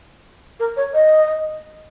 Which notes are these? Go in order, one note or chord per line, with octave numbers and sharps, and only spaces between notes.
A#4
C#5
D#5